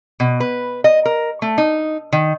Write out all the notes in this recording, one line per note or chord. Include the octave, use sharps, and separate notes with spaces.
B2
B4
D#5
A#4
A3
D#4
D#3